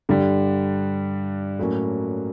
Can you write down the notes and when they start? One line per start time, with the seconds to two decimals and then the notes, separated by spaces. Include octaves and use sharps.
0.09 G2 D3 G3
1.59 A2 F#3 A#3 C#4